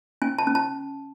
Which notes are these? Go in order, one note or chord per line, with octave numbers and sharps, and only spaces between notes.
C#4 G#5
A5
C#4
A5